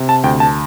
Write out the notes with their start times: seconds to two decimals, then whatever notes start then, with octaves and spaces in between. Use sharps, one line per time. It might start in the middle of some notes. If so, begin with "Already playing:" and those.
Already playing: C3
0.09 A5
0.24 D2 G5
0.40 A5